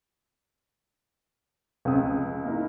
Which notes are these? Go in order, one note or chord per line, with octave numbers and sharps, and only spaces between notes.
F1 C#2 C4 D#6
A#3 D#4 E4